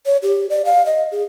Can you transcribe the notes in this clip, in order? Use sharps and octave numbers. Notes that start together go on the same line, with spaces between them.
C#5
G4
D5
F5
D#5
G#4